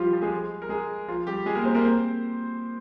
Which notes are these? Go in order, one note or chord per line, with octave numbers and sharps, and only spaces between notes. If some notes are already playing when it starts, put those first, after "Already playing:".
Already playing: F3 G3 F4 G4
F3 F4
G#3 G#4
A#4
G#3 G#4
F3 F4
G3 G4
G#3 G#4
A#3 A#4
C4 C5
A#3 A#4
C4 C5